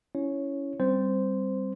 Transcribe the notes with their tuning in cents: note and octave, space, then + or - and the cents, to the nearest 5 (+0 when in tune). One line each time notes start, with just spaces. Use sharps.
C#4 +15 E4 +0 C#5 -5
G3 +0 C4 +0 C5 -10